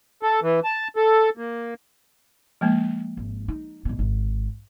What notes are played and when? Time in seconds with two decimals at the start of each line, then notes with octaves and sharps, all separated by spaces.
0.23 A4
0.42 E3
0.64 A5
0.96 A4
1.37 A#3
2.61 F3 G#3 A#3
3.17 G#1
3.48 D#4
3.85 G#1 B2
3.99 G#1